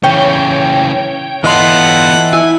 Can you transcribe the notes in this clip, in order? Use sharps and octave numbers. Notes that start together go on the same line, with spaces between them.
C#3 E3 C#5 G5
E3 B3 F4 A4 D#5 F#5 C6
E4 G#5